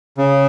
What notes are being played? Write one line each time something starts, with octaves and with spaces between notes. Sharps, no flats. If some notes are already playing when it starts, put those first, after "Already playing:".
C#3